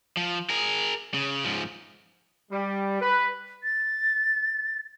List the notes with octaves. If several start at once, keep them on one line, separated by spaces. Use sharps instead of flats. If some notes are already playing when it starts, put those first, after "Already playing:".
F3
G#4 A#4
C#3
G#2 F3
G3
B4
A6